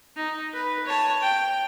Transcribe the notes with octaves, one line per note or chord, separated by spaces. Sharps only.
D#4
B4
C#5 A5
G5